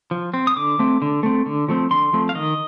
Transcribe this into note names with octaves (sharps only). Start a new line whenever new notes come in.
F3
C4
D#6
D3 D6
A3 C4
D3
A3 C4
D3
F3 A3 C4
D3 C6
F3 A3 C4
F5
D#3 D#5